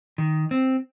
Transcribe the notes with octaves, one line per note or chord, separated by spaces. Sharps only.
D#3
C4